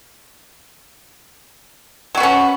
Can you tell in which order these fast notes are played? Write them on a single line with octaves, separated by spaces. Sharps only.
F#3 F#4 B3 C#4